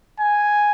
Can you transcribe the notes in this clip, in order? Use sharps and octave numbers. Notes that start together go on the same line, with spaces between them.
G#5